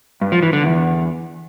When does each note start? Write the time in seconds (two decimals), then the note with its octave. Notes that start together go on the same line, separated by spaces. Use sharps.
0.21 G2
0.32 F3
0.43 E3
0.53 D3
0.64 E2